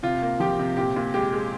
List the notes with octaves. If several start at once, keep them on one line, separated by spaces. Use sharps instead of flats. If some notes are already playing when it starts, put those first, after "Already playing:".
C3 F4
A#3
F3 G4
C3
A#2 G4
A#2
G#3 G4
G#3